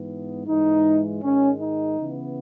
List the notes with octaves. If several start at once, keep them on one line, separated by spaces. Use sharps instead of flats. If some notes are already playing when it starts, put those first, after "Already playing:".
Already playing: G#2 E3 B3
G#2 E3 G#3 D#4
G#2 D#3 G#3 C#4
D#4
C#3 E3 B3